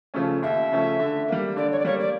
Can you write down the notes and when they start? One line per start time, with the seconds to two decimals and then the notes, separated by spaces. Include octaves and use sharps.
0.14 C#3 F3 A3 C#4
0.42 D#2 E5
0.71 C#3 F3 A3 C#4
0.99 D3
1.28 G3 A#3
1.56 D3 D5
1.72 C#5
1.79 D5
1.85 G3 A#3 C#5
2.00 D5